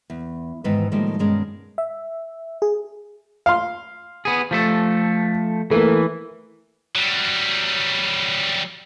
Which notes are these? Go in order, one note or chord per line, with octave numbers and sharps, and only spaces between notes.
E2
E2 G#2 D#3 E3 B3 B4
A2 D#3 F3 G3 G#3 A#3
G2 B2 D#3 G#3 C#4 A#4
E5
G#4
F5 C6
B3 G#4
F3 A3 A4
E3 A3 A#3
F#3 G3